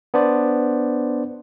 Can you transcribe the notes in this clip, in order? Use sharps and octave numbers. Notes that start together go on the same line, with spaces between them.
B3 D4 C5 D5